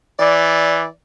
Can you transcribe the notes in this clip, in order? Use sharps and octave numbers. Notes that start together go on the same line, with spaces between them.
E3 D5